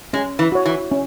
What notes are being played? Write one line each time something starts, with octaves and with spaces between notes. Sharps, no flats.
G#3 C#4
E3
F#4 C#5
E3
C#4